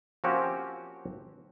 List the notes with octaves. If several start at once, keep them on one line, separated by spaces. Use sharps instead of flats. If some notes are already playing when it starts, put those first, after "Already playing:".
F3 A#3 C4 C#4 F#4 G4